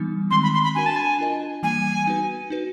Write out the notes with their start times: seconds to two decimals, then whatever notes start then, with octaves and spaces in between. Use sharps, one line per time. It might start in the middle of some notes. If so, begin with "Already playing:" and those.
Already playing: E3 G3 B3 D#4
0.31 D#3 G#3 C4 C6
0.43 B5
0.54 C6
0.63 B5
0.75 D4 F#4 A#4 G#5
0.86 A5
0.96 G#5
1.18 D4 F4 A#4 D#5
1.63 E3 G3 A#3 G#5
2.06 B3 D#4 F#4 B4
2.50 D#4 F#4 B4